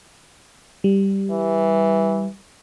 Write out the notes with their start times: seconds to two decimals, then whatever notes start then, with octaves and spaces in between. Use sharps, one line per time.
0.84 G3
1.31 E3